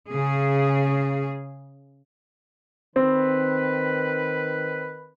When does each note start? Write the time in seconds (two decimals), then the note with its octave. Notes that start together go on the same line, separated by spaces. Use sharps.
0.11 C#3 G#4
2.96 D#3 C4 B4